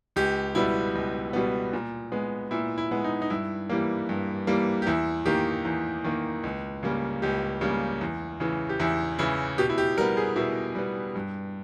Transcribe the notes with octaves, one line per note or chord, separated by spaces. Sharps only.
C#2 G4
B2 G3 B3 E4
C#2
B2 G3 B3
A#2
G#3 B3
A#2 E4
E4
G#3 B3
D#4
D#4
G2 E4
E3 G3 A#3
G2
E3 G3 A#3
G4
E2 E4
D#3 A#3 G4
E2
D#3 A#3
C#2
C#3 G3 A#3
C#2 G4
C#3 G3 A#3
E2
C#3 E3
G4
E2 E4
C#3 E3 E4
B2 G4
E4
G4
G3 B3 A#4
G#4
B2 E4
G3 B3
G2